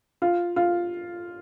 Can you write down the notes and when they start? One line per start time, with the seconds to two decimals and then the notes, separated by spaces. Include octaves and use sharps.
0.22 F4
0.56 F4